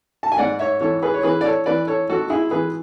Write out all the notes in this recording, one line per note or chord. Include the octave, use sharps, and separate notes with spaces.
A5
G#5
G#2 D5 F#5
C#5 E5
E3 A4 C#5
G#4 B4
C#5
E3 G#4 B4
D5
A4 C#5
E3 B4 D5
A4 C#5
G#1 F#4 A4
E4 G#4
E3 G#4 B4